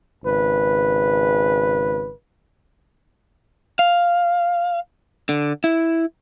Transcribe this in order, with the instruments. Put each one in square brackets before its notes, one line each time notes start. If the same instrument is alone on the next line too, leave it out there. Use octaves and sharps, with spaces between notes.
[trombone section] G#1 C#3 B4
[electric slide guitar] F5
D3
E4